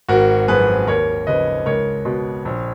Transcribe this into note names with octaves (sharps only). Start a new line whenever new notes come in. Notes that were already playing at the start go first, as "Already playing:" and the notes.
G#1 F#4 A#4
F#2 F3 G#4 B4
D#2 A#4 C#5
C#3 F3 B4 D#5
C#2 A#4 C#5
B2
A#1